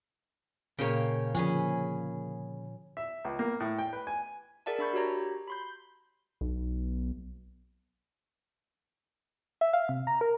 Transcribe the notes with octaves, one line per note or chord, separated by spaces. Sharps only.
A#2 C#3 A#3 C#5 G5
A#2 D3 F3 C#4 G#4 B4
E5
C#2
A#3
A2
G5
B4
G#5
G#4 A#4 D5 E5 F#5 A5
D4 E5 B5 C#6 G6
F#4 G4 C#5 A#5
B5 C6 G6
B1
E5
F5
C3
A#5
A#4